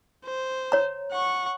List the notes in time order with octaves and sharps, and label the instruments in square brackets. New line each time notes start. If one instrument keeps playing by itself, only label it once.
[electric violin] C5
[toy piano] C#5 A#5
[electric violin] F#5 C#6